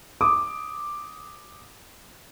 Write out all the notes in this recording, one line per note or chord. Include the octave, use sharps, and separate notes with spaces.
D6 D#6